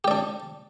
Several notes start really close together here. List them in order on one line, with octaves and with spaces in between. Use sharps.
G4 D5 D4